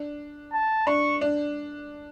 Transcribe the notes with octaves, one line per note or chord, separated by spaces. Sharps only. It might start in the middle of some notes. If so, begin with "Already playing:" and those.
Already playing: D4
A5
D4 C#6
D4